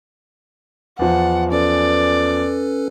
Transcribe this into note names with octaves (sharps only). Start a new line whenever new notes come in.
E2 F3 F#5
C#4 A4 B4 D5